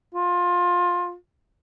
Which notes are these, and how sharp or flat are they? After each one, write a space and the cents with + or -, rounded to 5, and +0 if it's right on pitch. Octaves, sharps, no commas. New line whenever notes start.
F4 +20